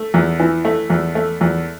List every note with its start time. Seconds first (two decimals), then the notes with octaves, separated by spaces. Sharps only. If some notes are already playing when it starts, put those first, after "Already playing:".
Already playing: A3
0.14 E2
0.40 E3
0.65 A3
0.90 E2
1.15 A3
1.41 E2